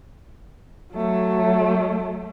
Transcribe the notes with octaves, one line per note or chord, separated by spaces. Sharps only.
F#3 A3